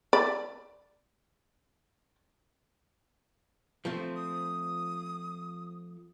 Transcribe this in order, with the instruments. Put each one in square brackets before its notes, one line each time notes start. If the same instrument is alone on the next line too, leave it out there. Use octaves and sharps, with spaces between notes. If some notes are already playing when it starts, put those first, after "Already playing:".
[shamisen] D5 B5
[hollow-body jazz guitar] F3 A3 C4
[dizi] D#6